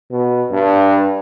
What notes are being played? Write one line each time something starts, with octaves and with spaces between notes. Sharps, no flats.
B2
G2